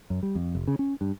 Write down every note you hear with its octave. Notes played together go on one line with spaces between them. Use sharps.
F#2
G3
F2
F1
C#3
C#4
G2